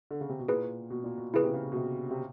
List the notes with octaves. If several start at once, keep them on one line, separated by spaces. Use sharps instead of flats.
D3
C#3
C3
B2
A#2 E4 G#4 B4
B2
A#2
B2
C#3 E4 G#4 B4
C3
C#3
B2
C3
C3